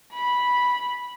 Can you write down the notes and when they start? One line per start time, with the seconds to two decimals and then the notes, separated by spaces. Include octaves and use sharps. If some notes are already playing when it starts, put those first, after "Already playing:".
0.13 B5